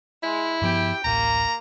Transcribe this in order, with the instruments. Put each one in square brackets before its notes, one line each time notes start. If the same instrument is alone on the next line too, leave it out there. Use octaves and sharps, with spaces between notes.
[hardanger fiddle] G#3 [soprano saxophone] E4
[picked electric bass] G2 F3 B3 [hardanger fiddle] G4 G5
[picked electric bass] D1 A1 [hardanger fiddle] A#3 [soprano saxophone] A#5